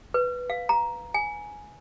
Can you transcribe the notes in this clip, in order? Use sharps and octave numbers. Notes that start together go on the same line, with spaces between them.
B4
F5
A#5
G#5